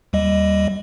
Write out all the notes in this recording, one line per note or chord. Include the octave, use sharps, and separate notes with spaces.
D#2 G3 D#5